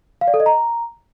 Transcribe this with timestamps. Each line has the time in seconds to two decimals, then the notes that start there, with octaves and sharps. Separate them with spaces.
0.21 F5
0.28 D5
0.34 A4
0.40 D#5
0.46 A#5